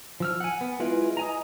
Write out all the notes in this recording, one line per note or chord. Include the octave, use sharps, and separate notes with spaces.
F3 E6 F6
F#5 G#5
B3
G#3 E4 F4 B4
D#5 G#5 A#5